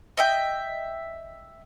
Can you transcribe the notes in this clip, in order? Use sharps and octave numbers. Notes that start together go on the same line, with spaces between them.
D#5 E5 G5